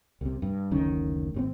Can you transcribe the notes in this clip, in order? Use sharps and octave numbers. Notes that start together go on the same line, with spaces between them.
C2 C3
G2
F#1 D2 D#3 C#4
G#1 C3 C4